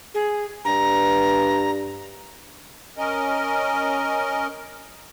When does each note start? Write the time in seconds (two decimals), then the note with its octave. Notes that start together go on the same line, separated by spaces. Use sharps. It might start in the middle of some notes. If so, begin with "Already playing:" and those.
0.14 G#4
0.65 G2 A#5
2.97 C#4 A#4 D#5